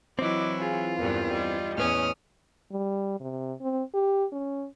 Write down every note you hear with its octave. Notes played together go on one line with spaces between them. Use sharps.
E3 F#3 C4 E4 D#5 D6
F4 G#4 F5
E2 G2 A#4
G3 D#5
E2 A2 C#4 B4 C#5 D#6 F6
G3
C3
C4
G4
C#4